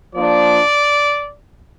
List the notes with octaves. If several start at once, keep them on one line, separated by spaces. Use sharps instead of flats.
F3 A#3 D4 D5